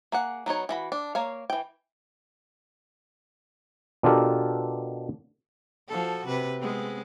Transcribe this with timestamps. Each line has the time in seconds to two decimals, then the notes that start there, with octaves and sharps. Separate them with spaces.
0.12 A#3 G#4 F#5
0.46 F#3 B3 D#4 C#5
0.69 E3 F#4 B5
0.92 D4
1.15 A#3 C#5 F5
1.50 E3 G5
4.03 B2 D4 F4 G4 A4 A#4
5.88 F3 F#4 A4
6.27 C3 B4
6.59 G#3 B3 C4